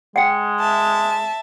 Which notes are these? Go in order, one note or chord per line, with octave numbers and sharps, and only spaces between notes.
G#3 F#5 G5
E5 A5